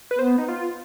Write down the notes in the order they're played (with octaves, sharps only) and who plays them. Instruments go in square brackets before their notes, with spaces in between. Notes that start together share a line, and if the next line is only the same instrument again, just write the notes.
[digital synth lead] B4
[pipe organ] B3 [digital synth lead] C5
[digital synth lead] D#4
F4